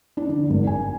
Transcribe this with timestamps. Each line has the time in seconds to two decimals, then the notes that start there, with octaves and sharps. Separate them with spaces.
0.17 D4
0.29 D3
0.50 G#1
0.67 G#5